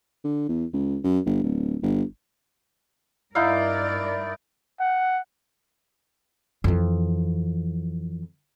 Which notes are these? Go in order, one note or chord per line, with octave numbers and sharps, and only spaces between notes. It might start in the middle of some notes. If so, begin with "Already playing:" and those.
D3
E2
C#2
F#2
G1
D1
G1
G2 D#4 E4 A#4 D5 F5
F#5
F2 E3